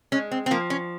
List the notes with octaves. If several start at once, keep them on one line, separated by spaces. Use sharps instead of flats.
G#3 C#4
C4
C4
F3 A#3
C#4